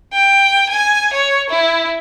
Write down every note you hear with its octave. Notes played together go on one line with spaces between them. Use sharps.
G5
G#5
C#5
E4